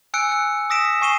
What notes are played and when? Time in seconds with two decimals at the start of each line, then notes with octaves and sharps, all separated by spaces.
0.14 G#5 E6 F#6 C#7 D7
0.32 F#6
0.70 D#6 E6 A#6 B6 D7 E7
1.01 G#5 C#6 C7 D#7 E7 G7